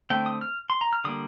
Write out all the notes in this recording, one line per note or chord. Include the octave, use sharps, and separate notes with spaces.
D3 A3 C4 G5
D#6
F6
C6
A#5
F6
D3 G3 A#3 D#6